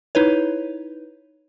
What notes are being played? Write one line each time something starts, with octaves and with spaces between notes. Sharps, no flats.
D#4 E4 B4 C#5